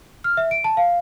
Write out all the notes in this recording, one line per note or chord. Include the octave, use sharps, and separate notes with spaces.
F6
E5
D7
A5
F5